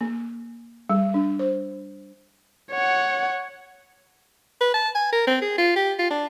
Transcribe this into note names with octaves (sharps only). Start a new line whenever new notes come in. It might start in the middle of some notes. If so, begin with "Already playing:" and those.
A#3
G3
D4
C5
C#5 F#5
B4
A5
G#5
A#4
C4
G#4
F4
G4
F4
D4